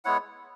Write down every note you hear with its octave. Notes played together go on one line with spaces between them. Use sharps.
G#3 B3 E4 C#5 F#5